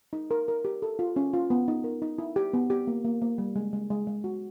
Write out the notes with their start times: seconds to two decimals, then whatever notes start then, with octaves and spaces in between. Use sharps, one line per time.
0.13 D#4
0.31 A#4
0.48 A#4
0.65 G4
0.82 A4
0.99 F4
1.16 C#4
1.33 F4
1.50 B3
1.68 D#4
1.84 A#4
2.02 D#4
2.18 E4
2.36 G4
2.53 B3
2.70 G4
2.87 A#3
3.04 A#3
3.22 A#3
3.38 G3
3.56 G#3
3.73 G#3
3.90 G#3
4.07 G#3
4.24 F#4